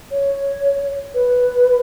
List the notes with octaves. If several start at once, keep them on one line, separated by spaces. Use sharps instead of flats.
C#5
B4